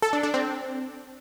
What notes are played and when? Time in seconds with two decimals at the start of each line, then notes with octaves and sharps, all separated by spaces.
0.02 A4
0.13 D4
0.23 D4
0.34 C4